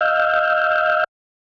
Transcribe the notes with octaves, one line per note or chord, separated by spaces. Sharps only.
D#5 F5 E6 F6 G6